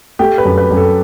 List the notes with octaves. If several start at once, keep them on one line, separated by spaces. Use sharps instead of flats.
A3 G4
B4
F#2
B4
F#2
A4